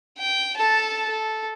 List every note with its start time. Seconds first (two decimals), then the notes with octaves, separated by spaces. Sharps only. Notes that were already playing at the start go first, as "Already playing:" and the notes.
0.19 G5
0.57 A4 A5
1.09 A4